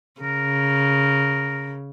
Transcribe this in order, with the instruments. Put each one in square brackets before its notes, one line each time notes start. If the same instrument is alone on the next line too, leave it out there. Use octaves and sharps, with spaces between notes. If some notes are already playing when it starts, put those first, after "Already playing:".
[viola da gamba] C#3 [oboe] A#4